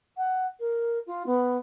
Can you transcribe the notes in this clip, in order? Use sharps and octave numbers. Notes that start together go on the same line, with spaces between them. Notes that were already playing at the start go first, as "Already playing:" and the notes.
F#5
A#4
F4
B3